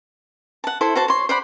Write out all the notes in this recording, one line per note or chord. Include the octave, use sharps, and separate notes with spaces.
F#5 A5
E4 A4 C5 C6
F#4 C5 A5
C#5 C6
C5 D5 F#5 B5